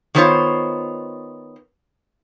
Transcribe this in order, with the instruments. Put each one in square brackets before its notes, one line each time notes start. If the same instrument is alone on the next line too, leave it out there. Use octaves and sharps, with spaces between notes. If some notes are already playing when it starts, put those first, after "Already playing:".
[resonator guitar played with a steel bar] D#3 F#3 B3 F4 C5 C#5